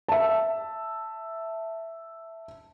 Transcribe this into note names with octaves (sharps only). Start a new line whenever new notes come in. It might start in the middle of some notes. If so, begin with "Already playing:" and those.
E5 A5